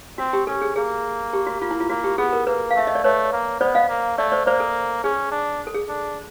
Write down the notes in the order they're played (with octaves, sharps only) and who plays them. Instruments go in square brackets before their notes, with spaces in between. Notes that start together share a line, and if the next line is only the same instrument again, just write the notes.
[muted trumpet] C4 [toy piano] F#4
[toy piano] G4
[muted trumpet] C#4 [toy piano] A4
[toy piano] G#4
[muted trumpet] A#3 [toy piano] G#4
[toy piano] G4
F#4
[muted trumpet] A#3 [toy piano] F4
[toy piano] E4
F4
[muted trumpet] A#3 [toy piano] F#4
[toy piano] G4
[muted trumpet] B3 [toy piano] G#4
[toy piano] A#4
[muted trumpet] A#3 [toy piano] B4
[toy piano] F5
[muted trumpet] A3 [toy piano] E5
[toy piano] D#5
D5
[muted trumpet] A3 [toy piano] B4 C#5
[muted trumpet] A#3
[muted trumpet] B3 [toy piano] C5 D5
[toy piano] D#5 F5
[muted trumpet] A#3
[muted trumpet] A3 [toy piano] D5 E5
[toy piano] C5 D5
[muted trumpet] A#3 [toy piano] C5 D5
[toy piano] A4
[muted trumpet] C#4 [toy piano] G#4
[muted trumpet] D4
[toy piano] A4
G#4
[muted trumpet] D4